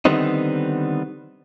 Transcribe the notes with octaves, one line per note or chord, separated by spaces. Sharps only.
D3 D#3 G3 B3 C4 D#4